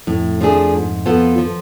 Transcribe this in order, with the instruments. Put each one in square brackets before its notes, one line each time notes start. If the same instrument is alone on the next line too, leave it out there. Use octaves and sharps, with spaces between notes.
[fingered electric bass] F2 [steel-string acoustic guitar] A2
[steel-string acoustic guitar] F3 A3 D4 G#4
G#2
F3 B3 F4 A4
F3